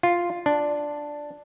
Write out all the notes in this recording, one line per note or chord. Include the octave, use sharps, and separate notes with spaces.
F4
D4